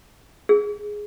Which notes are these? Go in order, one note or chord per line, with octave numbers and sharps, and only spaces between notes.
G#4